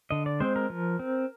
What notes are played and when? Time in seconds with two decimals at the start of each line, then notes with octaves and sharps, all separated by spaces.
0.11 D3 D#5
0.26 D5
0.40 G#3 C4 C5
0.56 A#4
0.70 F3
0.99 C4